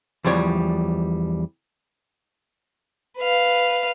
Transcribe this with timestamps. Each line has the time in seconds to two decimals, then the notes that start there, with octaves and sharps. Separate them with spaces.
0.24 E2 F3 G3 C#5 D5
3.18 B4 F5